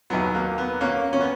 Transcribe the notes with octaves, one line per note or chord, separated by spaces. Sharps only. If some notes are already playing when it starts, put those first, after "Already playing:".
D#2 D#3 F#3 B3
A#3
B3
A#3 C#4
C#4
B3